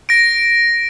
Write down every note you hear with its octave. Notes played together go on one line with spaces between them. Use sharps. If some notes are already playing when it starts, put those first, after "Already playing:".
A#6 D7